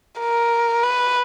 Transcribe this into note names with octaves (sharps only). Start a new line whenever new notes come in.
A#4
B4